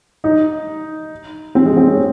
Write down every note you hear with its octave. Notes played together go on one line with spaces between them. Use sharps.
D#4
C4
G#3
C4
C#4